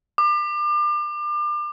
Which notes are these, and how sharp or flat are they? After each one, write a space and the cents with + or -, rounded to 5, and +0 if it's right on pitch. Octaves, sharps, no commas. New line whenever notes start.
D6 +35